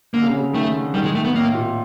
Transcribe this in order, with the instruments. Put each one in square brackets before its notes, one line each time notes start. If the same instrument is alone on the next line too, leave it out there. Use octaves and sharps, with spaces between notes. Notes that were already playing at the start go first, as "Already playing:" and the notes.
[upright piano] D3 [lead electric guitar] A#3
[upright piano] C#3
C#3
[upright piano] D#3 [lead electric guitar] A3
[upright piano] D3
[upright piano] D#3 [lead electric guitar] G3
[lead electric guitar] G#3
[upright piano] D#3 [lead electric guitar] A3
[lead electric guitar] B3
[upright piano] A2 [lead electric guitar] A#3
[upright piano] A#2